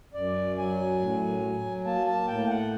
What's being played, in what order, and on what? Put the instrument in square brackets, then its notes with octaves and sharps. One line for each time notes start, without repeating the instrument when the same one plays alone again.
[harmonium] F#2 D5
F#3 G#5
A2
F#3
A#3 A5
A5
A2 G5
F#5